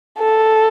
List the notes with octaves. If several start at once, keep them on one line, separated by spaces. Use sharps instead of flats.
A4